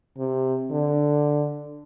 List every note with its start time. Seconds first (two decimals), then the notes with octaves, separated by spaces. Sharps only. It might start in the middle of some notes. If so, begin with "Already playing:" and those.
0.18 C3
0.72 D3